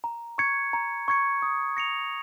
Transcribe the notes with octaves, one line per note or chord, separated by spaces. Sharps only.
A#5
C#6 G#6 C#7
A#5
C#6 G#6 C#7
D#6
A#6 C#7 F7